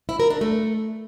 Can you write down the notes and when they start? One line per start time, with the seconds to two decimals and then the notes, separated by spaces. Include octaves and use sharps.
0.09 E4
0.20 A#4
0.30 D4
0.41 A3